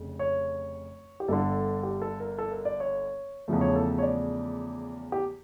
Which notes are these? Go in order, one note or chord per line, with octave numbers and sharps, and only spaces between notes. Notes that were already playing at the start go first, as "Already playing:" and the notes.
Already playing: F1 C#3
C#5
G4
G1 G2 D3 A4
G4
A4
A#4
A4
A#4
D5
C#5
E2 C#3 F3 A3
C#5
A4
C#5
D5
G4